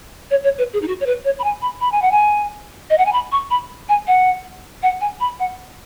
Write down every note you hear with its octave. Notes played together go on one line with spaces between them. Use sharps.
C#5
C#5
B4
G#4
D#4
F#4
C#5
B4
C#5
B5
G#5
B5
B5
G#5
F#5
G#5
D#5
F#5
G#5
B5
C#6
B5
G#5
F#5
F#5
G#5
B5
F#5